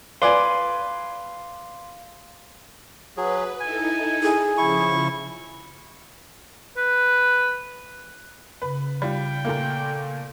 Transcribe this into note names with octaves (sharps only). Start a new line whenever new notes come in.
B4 D5 F5 G#5 C6
F#3 G#4 B4
D#4 E4 A4 G#5
G#4
C#3 F3 E4 C#6
B4
C#3 B4
G3 F4 G5
A#2 A3 A#3